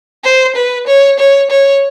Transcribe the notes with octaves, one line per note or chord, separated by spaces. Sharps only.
C5
B4
C#5
C#5
C#5